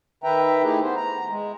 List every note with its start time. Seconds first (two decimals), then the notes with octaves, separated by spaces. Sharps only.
0.24 D#3 B4 E5 G5 A#5
0.63 A3 D#4 E4 G4 G#4
0.82 B3 C5
0.97 A#5
1.29 G#3